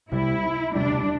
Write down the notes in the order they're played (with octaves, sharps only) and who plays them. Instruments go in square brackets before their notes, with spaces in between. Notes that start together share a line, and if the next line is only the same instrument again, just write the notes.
[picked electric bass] C2 C3 E3 G3 [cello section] E4
[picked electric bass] E1 D2 C3 G3 [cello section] D4